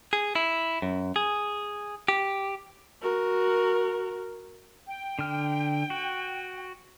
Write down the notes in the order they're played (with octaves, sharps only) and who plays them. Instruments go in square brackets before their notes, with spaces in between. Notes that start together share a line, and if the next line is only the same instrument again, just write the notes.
[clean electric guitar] G#4
E4
F#2
G#4
G4
[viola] F#4 A#4
[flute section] G5
[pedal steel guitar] D3 F6
F#4